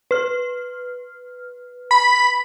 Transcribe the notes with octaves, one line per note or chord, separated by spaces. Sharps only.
B4 F6
B5